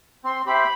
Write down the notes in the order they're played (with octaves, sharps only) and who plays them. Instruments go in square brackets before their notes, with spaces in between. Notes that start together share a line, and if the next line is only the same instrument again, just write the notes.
[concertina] C4 [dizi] C6
[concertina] G4 C5 E5 G5 [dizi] B5